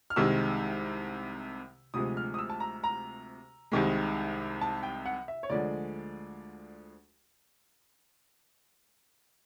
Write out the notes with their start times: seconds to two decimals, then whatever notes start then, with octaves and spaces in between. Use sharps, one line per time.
0.10 F6
0.16 C2 C3 D#3 G#3 E6
1.94 D2 C3 F3 G#3 D#6
2.17 F6
2.34 D#6
2.39 E6
2.50 A5
2.60 A#5
2.84 A#5
3.72 C2 C3 D#3 G#3
4.61 A5
4.83 G5
5.05 F#5
5.28 E5
5.43 C#5
5.50 D2 D3 F3 G#3 D5